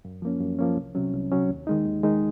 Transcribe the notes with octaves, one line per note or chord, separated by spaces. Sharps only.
F#2
F3 A#3 C#4
F#2
F3 A#3 C#4
C2
C3 F#3 C#4
C2
C3 F#3 C#4
D#2
D#3 G#3 D#4
D#2
D#3 G#3 D#4